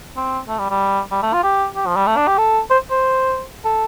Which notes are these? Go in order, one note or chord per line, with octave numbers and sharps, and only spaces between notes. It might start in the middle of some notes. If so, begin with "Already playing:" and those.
C4
A3
G3
G3
G3
A3
F4
G4
G4
F3
G3
A3
D4
G4
A4
C5
C5
A4